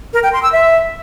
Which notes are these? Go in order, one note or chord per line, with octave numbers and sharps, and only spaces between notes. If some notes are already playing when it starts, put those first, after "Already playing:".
A#4
G5
C6
E6
E5